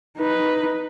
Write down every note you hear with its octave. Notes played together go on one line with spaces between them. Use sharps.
D#4 B4